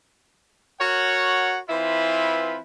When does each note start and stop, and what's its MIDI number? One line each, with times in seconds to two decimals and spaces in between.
0.80 1.59 66
0.80 1.59 70
0.80 1.59 73
0.80 1.59 78
1.69 2.59 52
1.69 2.59 60
1.69 2.59 64
1.69 2.59 65
1.69 2.59 71